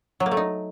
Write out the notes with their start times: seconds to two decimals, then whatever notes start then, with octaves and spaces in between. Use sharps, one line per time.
0.20 F#3
0.26 A#3
0.31 A3
0.37 D#4